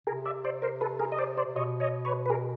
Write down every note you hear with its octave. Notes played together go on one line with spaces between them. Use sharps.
C3 G#4 A#4
D5 E5
C5 D5
A#4 C5
A4 B4
G#4 A#4
D#5
C5 D5
C5 D5
C3
B2 C#5 D#5
C#5 D#5
B4 C#5
B4
G#4 A#4